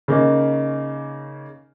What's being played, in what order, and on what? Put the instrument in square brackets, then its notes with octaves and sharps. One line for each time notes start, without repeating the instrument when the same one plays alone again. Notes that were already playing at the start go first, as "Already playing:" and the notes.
[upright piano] C#3 A#3 D#4